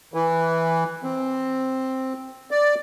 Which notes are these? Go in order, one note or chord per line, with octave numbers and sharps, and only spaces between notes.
E3
C4
D5